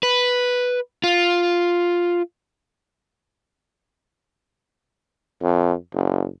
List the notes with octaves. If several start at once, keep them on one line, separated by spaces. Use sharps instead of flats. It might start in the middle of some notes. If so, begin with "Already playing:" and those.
B4
F4
F2
F#1